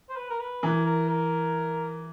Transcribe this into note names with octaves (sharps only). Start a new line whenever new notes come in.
C5
B4
A#4
B4
E3 A#4
A#4
A#4